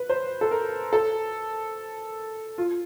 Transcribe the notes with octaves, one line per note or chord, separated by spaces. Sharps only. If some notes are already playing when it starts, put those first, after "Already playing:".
Already playing: B4
C5
A4
A#4
A4
F4